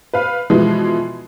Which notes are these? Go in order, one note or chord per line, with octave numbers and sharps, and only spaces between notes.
B4 F5
B2 E3 F3 G#3